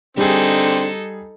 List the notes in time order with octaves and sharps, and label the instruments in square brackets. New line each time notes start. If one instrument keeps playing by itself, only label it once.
[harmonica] D3 C4 [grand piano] G3 G#4 [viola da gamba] D#4 A4